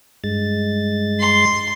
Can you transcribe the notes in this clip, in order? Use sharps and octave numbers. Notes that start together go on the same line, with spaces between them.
G2 G#3 A6
C6